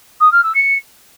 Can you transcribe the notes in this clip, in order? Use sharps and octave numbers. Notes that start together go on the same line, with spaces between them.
D#6
F6
E6
C#7